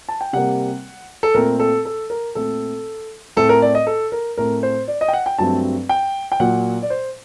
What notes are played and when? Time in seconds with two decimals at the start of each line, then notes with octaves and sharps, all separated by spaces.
0.09 A5
0.21 G5
0.33 C3 G3 A#3 F#5
1.23 A4
1.34 A#2 A3 C4 A#4
1.60 A4
1.85 A4
2.10 A#4
2.35 A#2 A3 C4 A4
3.37 A2 A3 C4 A4
3.49 A#4
3.62 D5
3.75 D#5
3.87 A4
4.12 A#4
4.38 A2 A3 C4 A#4
4.63 C5
4.88 D5
5.01 D#5
5.08 G5
5.13 F#5
5.26 G5
5.38 G2 F#3 A3 C4 A5
5.89 G5
6.32 G5
6.40 A#2 F#3 A#3 F#5
6.82 D5
6.90 C5